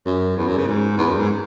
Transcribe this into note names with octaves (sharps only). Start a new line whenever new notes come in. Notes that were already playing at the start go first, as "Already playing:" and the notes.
F#2
E2
F#2
C#3
G#2
E2
F#2
G#2